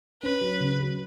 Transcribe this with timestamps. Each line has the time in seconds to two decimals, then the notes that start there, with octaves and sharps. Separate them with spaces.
0.23 C#4 B4
0.41 F#3
0.61 C#3
0.80 F#3